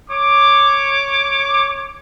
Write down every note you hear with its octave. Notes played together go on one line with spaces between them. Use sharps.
C#5 D6